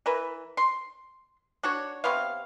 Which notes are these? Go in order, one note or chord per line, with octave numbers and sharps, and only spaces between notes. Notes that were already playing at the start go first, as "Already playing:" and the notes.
E3 A#4 B4
C6
D4 F#4 C#5
C3 B3 C#5 F5